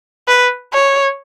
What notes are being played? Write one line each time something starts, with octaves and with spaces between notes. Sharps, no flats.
B4
C#5